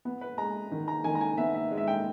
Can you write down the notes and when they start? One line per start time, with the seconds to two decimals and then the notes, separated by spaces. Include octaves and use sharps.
0.05 B3
0.21 B4
0.38 G#3 A#5
0.72 D#3
0.88 A#5
1.04 D#3 G#5
1.15 A#5
1.21 G#5
1.37 B3 E5
1.55 E5
1.71 G#3
1.77 E5
1.87 G5